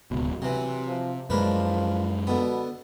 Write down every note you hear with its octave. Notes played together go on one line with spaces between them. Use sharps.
D1 C#2 B2
C3 E3 F#3
F3
F#2 F3 G#3 D4 A#4 B4
B2 D3 B3